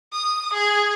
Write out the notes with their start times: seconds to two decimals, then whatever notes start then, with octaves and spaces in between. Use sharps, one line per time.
0.12 D#6
0.53 G#4